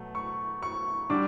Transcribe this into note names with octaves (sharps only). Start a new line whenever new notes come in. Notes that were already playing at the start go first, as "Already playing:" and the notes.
Already playing: B2 F#3 A3
C#6
C#6
D3 G3 D4 D6